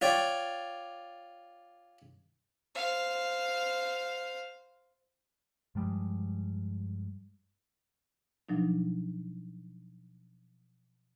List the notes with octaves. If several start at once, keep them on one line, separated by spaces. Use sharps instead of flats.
F4 C#5 D5 G5
C5 F5
G2 F3 G3 G#3
B2 F3 F#3 D4 D#4